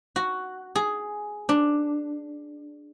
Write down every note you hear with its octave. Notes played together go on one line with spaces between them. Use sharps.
F#4
G#4
D4